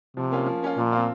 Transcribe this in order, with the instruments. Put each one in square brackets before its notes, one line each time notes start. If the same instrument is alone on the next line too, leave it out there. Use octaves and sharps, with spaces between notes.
[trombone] C3 [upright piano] F3
[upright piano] A#3 C#4 F4
F3
A#3 C#4 F4
[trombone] A#2 [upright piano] F3
[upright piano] C4 F4